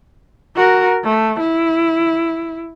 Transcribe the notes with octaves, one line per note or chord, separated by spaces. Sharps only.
F#4 A#4
A3
E4